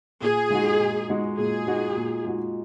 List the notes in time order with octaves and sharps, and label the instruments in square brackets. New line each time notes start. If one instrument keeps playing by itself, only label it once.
[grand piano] A#2 [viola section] G#4
[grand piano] G#3 D#4 F#4
A#2
G#3 D#4 F#4
[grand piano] A#2 [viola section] G#4
[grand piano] G#3 D#4 F#4
A#2
G#3 D#4 F#4